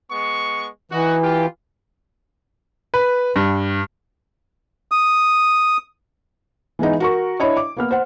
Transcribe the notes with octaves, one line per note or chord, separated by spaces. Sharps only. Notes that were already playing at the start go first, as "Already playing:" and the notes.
G#3 B3 C#6
E3 D#4 F#4
F4 G4
B4
G2
D#6
E3 G#3 B3 D#4
F#4 A#4 C#6
D4 E4 C#5 D#5
D6
A#3 B3 F6
C5 F#5